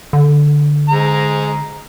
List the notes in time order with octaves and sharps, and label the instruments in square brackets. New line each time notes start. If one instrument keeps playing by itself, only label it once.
[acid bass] D3
[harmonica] G#3 A#5